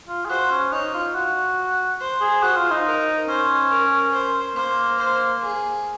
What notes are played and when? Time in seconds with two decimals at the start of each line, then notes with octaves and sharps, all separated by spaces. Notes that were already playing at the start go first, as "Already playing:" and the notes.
0.08 F4
0.25 G#4
0.29 F#4 C5
0.51 C#4
0.71 D#4 C#5
0.94 F4
1.15 F#4
2.00 C5
2.21 G#4
2.43 F#4 C5
2.56 F4
2.70 D#4
2.86 A#4
3.28 C#4 C5
3.71 A#4
4.13 C5
4.56 A#3 C5
4.98 C5
5.41 G#4